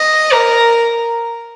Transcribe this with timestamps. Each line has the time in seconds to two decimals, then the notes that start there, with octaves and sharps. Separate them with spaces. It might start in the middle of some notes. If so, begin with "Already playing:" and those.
Already playing: D#5
0.32 A#4